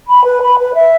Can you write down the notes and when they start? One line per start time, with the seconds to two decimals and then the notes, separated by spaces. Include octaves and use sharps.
0.09 B5
0.25 B4
0.41 B5
0.58 B4
0.74 E5